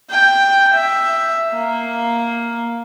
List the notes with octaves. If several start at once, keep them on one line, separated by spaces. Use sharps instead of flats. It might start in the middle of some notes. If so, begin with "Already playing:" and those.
G5
E5
A#3